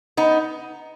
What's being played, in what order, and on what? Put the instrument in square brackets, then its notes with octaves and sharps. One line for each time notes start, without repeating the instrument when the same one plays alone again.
[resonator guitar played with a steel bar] B3 D#4